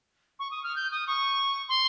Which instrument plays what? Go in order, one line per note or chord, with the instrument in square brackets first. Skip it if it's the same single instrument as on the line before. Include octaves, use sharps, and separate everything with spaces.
[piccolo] C#6
D#6
F6
G6
D#6
C#6
C6